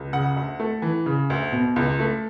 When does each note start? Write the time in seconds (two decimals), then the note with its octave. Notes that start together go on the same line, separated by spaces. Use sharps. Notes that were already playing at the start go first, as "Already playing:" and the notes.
Already playing: C#2
0.13 C#3 F#5
0.36 D2
0.60 A3
0.82 E3
1.06 C#3
1.30 D2
1.52 B2
1.76 C#2
2.00 A3